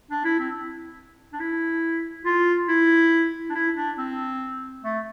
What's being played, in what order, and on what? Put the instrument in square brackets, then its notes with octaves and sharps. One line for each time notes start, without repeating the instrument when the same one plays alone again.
[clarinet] D4
E4
C4
D4
E4
F4
E4
D4
E4
D4
C4
A3